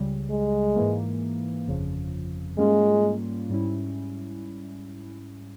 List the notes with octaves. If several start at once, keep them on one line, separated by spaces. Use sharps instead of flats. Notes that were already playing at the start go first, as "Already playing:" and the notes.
Already playing: C#2 C#3 G3
G#3
G#2 E3 A#3
G1 F2 C#3 F3
G#2 G3 G#3 A#3 C#4 F4
G#2 G3 C#4 E4